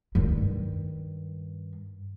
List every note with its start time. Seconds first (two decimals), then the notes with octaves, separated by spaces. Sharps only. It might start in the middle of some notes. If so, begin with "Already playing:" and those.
0.15 G2 D#3